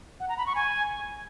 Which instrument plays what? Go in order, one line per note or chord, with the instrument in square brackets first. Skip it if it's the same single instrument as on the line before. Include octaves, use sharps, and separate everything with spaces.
[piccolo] F#5
A#5
B5
C#6
G#5